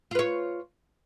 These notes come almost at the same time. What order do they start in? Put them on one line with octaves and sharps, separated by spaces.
F4 B4 C#5